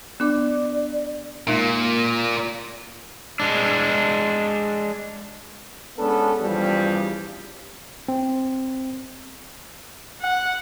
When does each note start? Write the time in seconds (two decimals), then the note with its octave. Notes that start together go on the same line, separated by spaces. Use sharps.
0.20 B3 D4 D5 D6
1.47 A#2 G#3 A#3 D#4 E5
3.40 G#3 D4
5.98 G#3 B3 C#4 D4 A4
6.41 E2 G2 C#3 F3 G3
8.08 C4
10.21 F#5